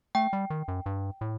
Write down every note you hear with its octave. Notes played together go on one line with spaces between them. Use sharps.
A3 G5
G3
D#3
F#2
G2
A2